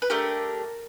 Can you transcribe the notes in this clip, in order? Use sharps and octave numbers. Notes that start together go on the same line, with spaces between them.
B4
A3 D4 G4 A#4